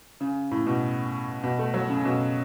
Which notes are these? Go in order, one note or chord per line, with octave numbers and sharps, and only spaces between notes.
C#3
A2
B2
B2
A3
F#3
C#3
B2